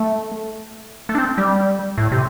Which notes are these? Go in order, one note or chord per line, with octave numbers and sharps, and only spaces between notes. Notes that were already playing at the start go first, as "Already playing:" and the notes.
Already playing: A3
A3
D4
C4
G3
A2
C3